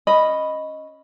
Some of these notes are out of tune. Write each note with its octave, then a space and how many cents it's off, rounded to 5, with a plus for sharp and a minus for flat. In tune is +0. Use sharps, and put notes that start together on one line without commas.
C#4 +0 D#5 +5 B5 +0